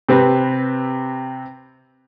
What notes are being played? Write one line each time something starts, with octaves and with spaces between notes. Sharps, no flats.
C3 C4 B4